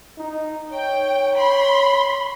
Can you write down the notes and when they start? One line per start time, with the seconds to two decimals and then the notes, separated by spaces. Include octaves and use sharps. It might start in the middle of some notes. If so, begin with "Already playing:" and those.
0.18 D#4
0.72 C#5 G5
1.37 B5 C6